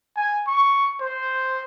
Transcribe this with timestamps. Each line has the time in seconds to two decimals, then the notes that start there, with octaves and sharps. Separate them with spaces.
0.16 G#5
0.47 C#6
1.00 C5